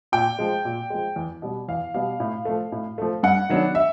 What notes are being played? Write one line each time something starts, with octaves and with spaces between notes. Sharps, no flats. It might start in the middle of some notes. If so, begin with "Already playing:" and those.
A#2 G5
F3 G#3
A#2
F3 G#3
E2
B2 G3 B3
E2 F5
B2 G3 B3 F5
A2
F3 A3
A2
F3 A3
G2 F#5
D#3 F#3 B3 D4
E5